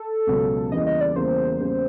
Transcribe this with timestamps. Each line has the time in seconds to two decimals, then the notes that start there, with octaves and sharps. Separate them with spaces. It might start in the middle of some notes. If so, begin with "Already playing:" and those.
Already playing: A4
0.27 C#2 B2 F#3
0.72 E2 C#3 E3 G3 A#3 D#5
0.87 D#5
1.01 D5
1.16 E2 C#3 E3 G3 A#3 C5
1.60 E2 C#3 E3 G3 A#3